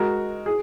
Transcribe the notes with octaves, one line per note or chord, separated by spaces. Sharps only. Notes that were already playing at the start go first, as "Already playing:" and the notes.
Already playing: G#3 F#4 A#4
G#4